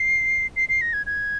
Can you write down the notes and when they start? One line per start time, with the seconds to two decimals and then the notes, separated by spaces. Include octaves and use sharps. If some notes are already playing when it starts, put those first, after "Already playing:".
Already playing: C7
0.56 C7
0.69 C7
0.81 A#6
0.93 G#6
1.06 G#6